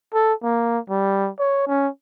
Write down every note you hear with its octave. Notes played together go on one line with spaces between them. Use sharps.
A4
A#3
G3
C#5
C#4